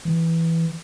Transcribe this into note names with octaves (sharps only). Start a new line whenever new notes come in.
E3